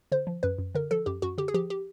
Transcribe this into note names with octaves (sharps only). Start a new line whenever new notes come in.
D3 C5
F3
F#2 B4
F#2
D3 A#4
F3 A4
F#2 G4
F#2 F#4
D3 G4
G#4
F3 G4
G4